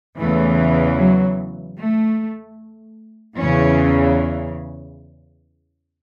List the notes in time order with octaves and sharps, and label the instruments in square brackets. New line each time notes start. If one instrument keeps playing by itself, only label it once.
[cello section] E2 C#3 E3 A3
F#3
A3
E2 C#3 E3 C#4